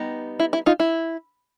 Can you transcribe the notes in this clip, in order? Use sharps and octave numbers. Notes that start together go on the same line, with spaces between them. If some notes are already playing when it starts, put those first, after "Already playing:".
Already playing: G3 B3 D#4
E4
E4
D#4 F4
E4